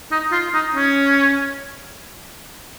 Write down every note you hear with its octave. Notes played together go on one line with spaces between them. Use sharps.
D#4
F4
D#4
C#4